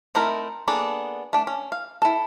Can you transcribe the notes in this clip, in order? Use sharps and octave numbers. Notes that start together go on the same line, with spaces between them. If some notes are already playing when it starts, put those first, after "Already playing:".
A3 C4 D#4 E4 A#4
A#3 B3 D4 G#4 A4
A3 D4
C#4
F5
E4 A4